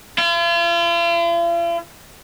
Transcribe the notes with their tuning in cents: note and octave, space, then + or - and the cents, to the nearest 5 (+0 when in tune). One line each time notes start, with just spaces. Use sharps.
F4 -45